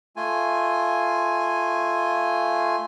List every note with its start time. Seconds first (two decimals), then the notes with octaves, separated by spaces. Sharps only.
0.16 A3 F4 G#5